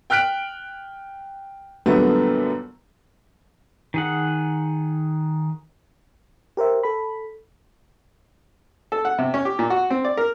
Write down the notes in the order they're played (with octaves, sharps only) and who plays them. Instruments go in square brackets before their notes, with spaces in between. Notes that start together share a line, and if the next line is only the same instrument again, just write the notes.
[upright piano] G5 F6 F#6 B6 D7
F#2 A#2 D3 G3 A3 B3
[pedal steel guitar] D#3 G#4 F#5
[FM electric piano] G4 A#4 C5 E5
A4 B5
[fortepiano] A4
F#5
C3
C#4
G4
A#2
F#4
C4
D5
A#4